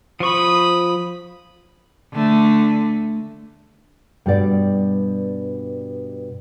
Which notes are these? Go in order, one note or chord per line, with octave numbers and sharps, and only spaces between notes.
F3 B5 C#6 D#6
D3 A3
G2 B2 G3 D5 F#5